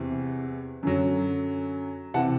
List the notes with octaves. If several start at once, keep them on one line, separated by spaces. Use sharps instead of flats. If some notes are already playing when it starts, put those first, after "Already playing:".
Already playing: E2 C3 E3
F#2 D3 F#3
C3 E3 F#5 A5